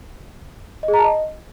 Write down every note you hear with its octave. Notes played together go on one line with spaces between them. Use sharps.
D#5
G#4
A#5
A5
D#5